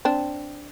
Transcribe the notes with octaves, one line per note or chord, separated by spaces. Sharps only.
C4 D4